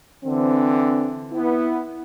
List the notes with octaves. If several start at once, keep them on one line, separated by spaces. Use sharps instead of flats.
D3 E3 C4
B3 E4